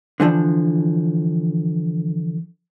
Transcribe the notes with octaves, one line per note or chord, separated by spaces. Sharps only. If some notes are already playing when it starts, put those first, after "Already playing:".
D3 E3 F3 D4